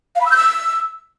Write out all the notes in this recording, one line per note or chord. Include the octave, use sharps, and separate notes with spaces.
F5
B5
E6
G6
E6